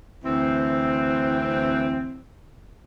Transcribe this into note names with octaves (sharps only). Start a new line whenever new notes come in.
D2 E3 C4